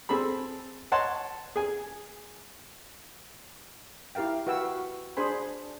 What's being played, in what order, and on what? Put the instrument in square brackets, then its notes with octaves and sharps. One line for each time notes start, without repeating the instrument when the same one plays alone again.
[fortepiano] C4 G#4 A4 B5
C#5 D#5 F#5 A5 C6
G#4 G#5
[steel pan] E4 G4 A#4 F5 G5
F#4 B4 F5 G5 E6
D4 G#4 C5 G#5 B5